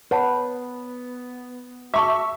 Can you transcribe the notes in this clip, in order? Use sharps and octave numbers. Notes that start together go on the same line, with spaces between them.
B3 B4 C#5 F#5 A5
F#4 E5 A5 C#6 D6